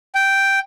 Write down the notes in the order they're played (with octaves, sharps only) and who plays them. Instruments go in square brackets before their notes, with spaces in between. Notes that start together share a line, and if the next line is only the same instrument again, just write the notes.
[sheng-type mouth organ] G5